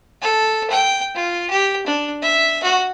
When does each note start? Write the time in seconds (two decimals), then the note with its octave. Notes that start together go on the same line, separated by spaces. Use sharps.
0.22 A4
0.70 G5
1.15 F4
1.50 G4
1.86 D4
2.22 E5
2.63 F#4